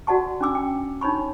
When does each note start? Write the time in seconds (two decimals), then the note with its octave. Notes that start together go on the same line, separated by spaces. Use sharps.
0.07 F#4 D5 F#5 A5 C#6
0.41 C#4 D4 D6 E6
0.55 G5
1.01 D4 D#4 C#5 B5 C#6